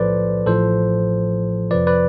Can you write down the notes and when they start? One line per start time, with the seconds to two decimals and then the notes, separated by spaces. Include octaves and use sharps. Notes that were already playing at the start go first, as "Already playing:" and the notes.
Already playing: B1 A2 F3 A4 B4 C5 D5
0.46 A1 A2 F3 A4 C5
1.71 F2 C3 F3 B4 D5
1.87 B4 D5